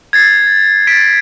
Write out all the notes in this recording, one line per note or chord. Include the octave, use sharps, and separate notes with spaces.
G#6 A6 C7
A6 B6 D7